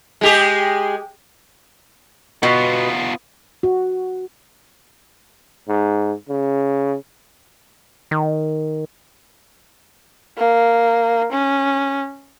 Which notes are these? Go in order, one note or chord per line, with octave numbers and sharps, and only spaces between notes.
G#3 G4 G#4
B2 B3 F4
F#4
G#2
C#3
D#3
A#3
C#4